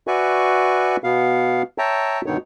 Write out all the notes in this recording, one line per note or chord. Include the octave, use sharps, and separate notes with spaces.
F#4 B4 D5 E5 G#5 C#6
B2 B3 F5
C#5 E5 G5 A5 A#5
G2 B2 D3 D#3 D#4 C#5